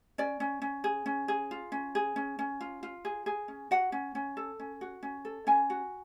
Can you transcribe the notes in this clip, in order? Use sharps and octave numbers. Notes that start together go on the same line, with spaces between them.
C#4 D5
C#4
C#4
G#4
C#4
G#4
F4
C#4
G#4
C#4
C#4
F4
F4
G#4
G#4
C#4
F#4 F#5
C#4
C#4
A4
C#4
F#4
C#4
A4
C#4 G#5
F#4